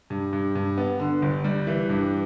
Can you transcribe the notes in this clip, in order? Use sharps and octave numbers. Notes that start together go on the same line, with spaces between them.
G2
G2
G2
B3
D3
G1
G3
E3
G2